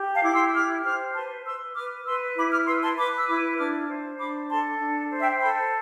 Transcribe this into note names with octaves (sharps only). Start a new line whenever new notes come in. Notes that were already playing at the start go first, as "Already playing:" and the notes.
Already playing: G4
F5 A5
E4 D6
C6 E6
G4 D6 F6
C5 D6 F6
B4 A5 C6
B4 C6 E6
B4 D6 F6
B4 C6 E6
E4 B5 D6
D6 F6
B4 C6 E6
A5 C6
B4 B5 D6
E6
E4 B5 D6
D4 D6 F6
C5
D4 B5 D6
A4 A5 C6
D4
C5
E5 G5
A4 G5 B5